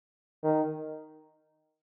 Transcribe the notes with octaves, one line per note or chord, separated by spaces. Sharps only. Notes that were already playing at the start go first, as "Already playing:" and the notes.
D#3